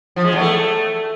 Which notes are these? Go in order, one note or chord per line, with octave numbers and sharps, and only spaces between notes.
F3
G#3
E2
A3